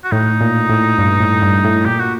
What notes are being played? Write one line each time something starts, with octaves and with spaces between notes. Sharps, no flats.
F#4
A2 D#4
A#2
A2
G2
A2
G2
A2
A#2 G4
F#4